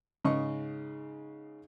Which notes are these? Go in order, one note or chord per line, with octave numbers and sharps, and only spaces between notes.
G#2 C#3 D#5 C#6